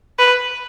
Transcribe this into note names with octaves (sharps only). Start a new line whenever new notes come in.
B4